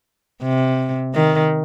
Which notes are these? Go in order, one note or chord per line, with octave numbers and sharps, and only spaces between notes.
C3
D#3